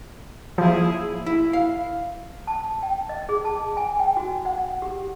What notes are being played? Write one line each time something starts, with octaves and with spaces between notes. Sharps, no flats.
F3 A#3 E4 G#4
E4
F5
A5
G5
D#5
G#4
A5
G#5
G5
F#4
F#5
G4